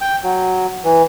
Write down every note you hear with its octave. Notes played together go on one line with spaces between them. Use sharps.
G5
F#3
E3